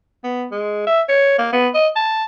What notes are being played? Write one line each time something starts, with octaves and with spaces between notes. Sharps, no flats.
B3
G#3
E5
C#5
A#3
B3
D#5
A5